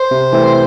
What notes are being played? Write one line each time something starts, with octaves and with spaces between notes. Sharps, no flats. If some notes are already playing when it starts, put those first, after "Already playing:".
Already playing: C5
C3
E3 A3 C4